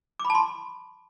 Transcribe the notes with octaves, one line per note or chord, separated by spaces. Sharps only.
D6
B5
A5
C6